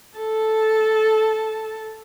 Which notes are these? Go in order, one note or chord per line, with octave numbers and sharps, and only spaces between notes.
A4 A5